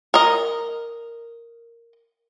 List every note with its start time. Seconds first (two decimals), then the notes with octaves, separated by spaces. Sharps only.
0.14 A#4 D#5